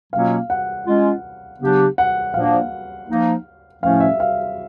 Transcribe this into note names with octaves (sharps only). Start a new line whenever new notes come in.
B2 F#3 A#3 C#4 F4 F5
F#5
G#3 C#4 F4
C#3 F#3 B3 D4 G4
F#5
A#2 F3 A#3 D4 F5
F3 A#3 D#4
A2 F3 A3 C#4 F5
E5
F5